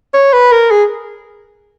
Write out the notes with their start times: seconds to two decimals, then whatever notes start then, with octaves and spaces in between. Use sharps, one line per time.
0.14 C#5
0.33 B4
0.52 A#4
0.71 G#4